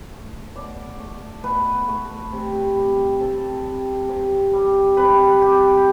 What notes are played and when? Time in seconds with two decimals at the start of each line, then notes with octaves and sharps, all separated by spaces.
0.11 A3
0.56 B2 D5
0.99 A3
1.43 B2 B4
1.88 A3
2.32 C3
2.76 G3
3.20 C3 A4
3.65 G3
4.09 C3
4.53 G3
4.97 C3 B4
5.41 G3 G4